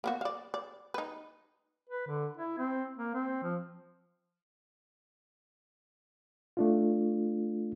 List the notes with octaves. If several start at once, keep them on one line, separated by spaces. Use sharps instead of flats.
A#3 B3 F#4
D5 F5
D5
D#4 B4
B4
D3
E4
C4
A#3
C4
F3
A3 D4 F4